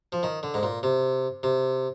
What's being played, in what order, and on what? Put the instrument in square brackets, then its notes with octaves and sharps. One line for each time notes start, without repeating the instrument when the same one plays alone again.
[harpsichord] F3
D#3
D3
G#2
A#2
C3
C3